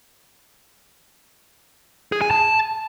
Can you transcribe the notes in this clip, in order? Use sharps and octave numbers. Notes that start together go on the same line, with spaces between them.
G#4
G#5
A5